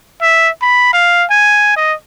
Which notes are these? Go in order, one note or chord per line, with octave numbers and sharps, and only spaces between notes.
E5
B5
F5
G#5
D#5